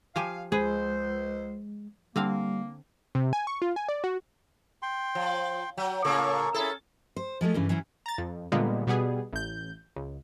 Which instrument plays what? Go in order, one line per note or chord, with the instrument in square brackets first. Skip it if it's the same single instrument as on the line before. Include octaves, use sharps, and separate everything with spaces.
[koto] F3 G4 G#5 [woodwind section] F5
[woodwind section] C#2 C5 [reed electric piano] G#3 [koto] G#4 B4
[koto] D3 C4 F5 [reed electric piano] G3 [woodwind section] A#3
[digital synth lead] C3
G#5
C#6
F4
G#5
D5
F#4
[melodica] G5 C6
[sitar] F3
[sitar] F#3 [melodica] G5
[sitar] A2 C#3 A#3 [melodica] A4 C#6
[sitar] C#4 A4 [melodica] E4 G#4
[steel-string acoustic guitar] C5
F3 G#3 A3 F4
G2 C#3 E3
E3 F#3 C#4 E4
[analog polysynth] A#5 A6
F2
A#2 D3 G3 G#3 A#3 B3
B2 G3 B3 G#4
A1 G6
C#2